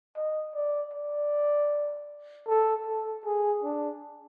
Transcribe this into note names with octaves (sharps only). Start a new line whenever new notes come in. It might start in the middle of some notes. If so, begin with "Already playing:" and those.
D#5
D5
D5
A4
A4
G#4
D4